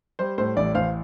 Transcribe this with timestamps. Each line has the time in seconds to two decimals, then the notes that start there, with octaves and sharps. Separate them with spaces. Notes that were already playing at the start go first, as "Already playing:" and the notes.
0.19 G3 C5
0.38 A2 C5
0.57 A1 D5
0.74 A1 C5 F5